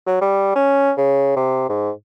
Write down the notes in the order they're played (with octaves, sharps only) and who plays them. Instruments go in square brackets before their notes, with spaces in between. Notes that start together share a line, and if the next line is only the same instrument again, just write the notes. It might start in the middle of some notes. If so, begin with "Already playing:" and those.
[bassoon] F#3
G3
C#4
C#3
C3
G#2